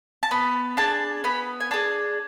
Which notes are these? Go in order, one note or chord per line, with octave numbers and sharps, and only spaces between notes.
A5
B3 B5
D4 G#4 A5
B3 B5
G#5
D4 G#4 A5